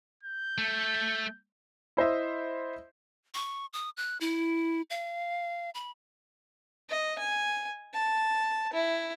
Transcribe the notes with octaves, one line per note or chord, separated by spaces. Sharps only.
G6
A3
E4 C5 D#5 E5
C#6
D#6
F#6
E4
F5
B5
D#5
G#5
A5
E4